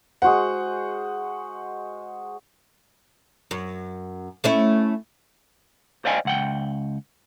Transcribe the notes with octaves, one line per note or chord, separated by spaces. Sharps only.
G#3 F#4 C5 F#5
F#2
A3 C#4 E4
C5 D5 D#5 F5 G5 G#5
C#2 F#5 G5